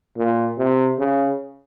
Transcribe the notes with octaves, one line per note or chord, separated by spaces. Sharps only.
A#2
C3
C#3